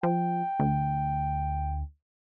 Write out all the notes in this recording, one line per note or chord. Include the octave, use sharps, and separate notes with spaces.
F3 G5
D2